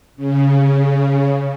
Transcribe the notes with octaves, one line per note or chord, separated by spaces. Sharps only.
C#3